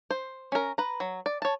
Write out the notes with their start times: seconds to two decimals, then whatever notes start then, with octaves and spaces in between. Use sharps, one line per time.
0.11 C5
0.52 C#4 A#4
0.78 B4 A#5
1.00 F#3
1.26 D5
1.42 C#5 A5